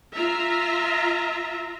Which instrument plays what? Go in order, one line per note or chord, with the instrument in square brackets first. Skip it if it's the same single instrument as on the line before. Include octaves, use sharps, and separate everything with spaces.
[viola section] F4 E5 A#5